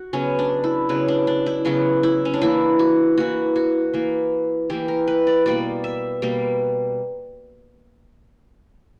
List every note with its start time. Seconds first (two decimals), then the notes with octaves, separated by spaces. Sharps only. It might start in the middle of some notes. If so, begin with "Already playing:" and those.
Already playing: F#4
0.13 C#3 F#3 B3 C#4
0.39 D4
0.64 E4
0.89 C#3 F#3 B3 B4
1.08 D4
1.27 D4
1.46 E4
1.65 C#3 F#3 B3 F#4
2.03 E4
2.25 C#4
2.34 D4
2.42 E3 A#3 E4
2.79 F#4
3.17 E3 A#3 F#4
3.56 F#4
3.94 E3 A#3
4.70 E3 A#3 G4
4.88 A#4
5.07 B4
5.27 D5
5.46 B2 G3 A#3 D5
5.84 E5
6.22 B2 G3 A#3